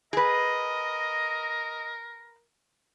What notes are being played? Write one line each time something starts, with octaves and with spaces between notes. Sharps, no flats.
G#4 A#4 B4 D#5